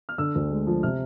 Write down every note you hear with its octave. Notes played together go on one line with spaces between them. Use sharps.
F6
D3 E6
D2
G#3
F3
C3 F6